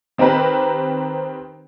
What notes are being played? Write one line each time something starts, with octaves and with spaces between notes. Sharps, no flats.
D#3 C4 G4 A#4 B4